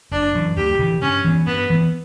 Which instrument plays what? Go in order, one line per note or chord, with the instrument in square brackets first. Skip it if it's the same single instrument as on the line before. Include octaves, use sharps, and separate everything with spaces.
[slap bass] F#1 [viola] D4
[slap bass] F#2 E3
[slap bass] D2 [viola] G4
[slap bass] C#3 E3
[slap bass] G2 [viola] C#4
[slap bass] E3 B3
[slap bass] G2 [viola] B3
[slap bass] E3 B3